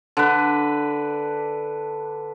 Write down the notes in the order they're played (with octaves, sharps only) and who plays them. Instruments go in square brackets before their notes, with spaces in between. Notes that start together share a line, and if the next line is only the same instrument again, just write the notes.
[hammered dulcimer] D3 B4